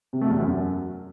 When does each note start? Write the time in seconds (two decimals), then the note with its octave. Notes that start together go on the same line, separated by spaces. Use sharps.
0.13 C3
0.21 A3
0.30 E2
0.38 F#2